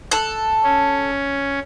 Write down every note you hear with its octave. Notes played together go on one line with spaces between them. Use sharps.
A4 F#6
C#4